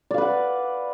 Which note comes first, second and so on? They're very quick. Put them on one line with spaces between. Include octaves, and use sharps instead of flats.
D5 F5 B4 F#5